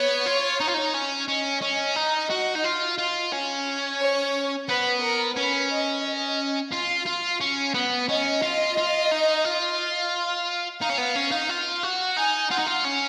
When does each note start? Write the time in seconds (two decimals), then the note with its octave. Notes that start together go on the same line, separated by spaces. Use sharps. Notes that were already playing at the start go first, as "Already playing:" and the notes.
Already playing: B3 C#5
0.26 F4
0.60 D#4
0.68 F4
0.74 D#4
0.94 C#4
1.28 C#4 D#5
1.62 C#4
1.96 D#4
2.30 F#4
2.56 D#4
2.64 F4
2.98 F4
3.32 C#4
4.00 C#5
4.68 B3 B4
5.02 A#4
5.36 C#4 B4
5.71 D#5
6.04 D#5
6.72 F4 F5
7.06 F4
7.41 C#4
7.74 B3
8.09 C#4 D#5
8.42 F4
8.77 F4
9.11 D#4
9.45 F4
10.80 D#4 F5
10.89 C#4
10.98 B3
11.15 C#4
11.31 D#4
11.49 F4
11.83 F#4
12.17 D#4 G#5
12.51 F4 F#5
12.59 D#4
12.67 F4
12.85 C#4